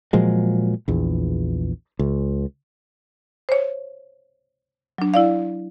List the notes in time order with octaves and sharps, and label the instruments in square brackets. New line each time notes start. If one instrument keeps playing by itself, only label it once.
[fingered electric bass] A#2 F3 F#3 G#3
A#1 E2
C#2
[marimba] C5 C#5
F#3 D4
E4 D5 F5